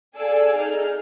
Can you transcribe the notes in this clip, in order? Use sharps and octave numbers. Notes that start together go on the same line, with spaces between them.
G#4 A4 D5 F5 G#5 E6
D#4 G#4 F6